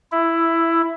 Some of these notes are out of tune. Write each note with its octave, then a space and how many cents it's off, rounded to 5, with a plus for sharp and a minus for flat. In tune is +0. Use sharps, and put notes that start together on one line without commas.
E4 +10